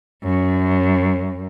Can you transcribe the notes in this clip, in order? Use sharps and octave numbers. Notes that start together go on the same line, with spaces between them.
F#2